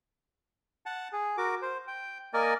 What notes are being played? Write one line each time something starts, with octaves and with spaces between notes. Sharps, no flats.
F#5 A5
G#4
F#4 A#4 D6
C5
G5
A#3 A#4 D5 D#5 G#5